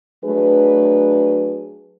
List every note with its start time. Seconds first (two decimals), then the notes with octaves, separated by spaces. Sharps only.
0.25 F#3 A3 D4 G#4 B4